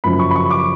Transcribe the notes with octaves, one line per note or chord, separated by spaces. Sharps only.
F#1 F#2 F3 B5
C#6
B5
C#6
D6